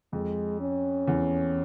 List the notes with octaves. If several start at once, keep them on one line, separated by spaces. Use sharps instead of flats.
F2 G#3
C#4
E2